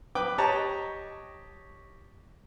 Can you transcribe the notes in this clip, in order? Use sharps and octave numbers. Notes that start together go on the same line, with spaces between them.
B4 G5 D6
G4 C#5 D#5 A5 A#5 C#6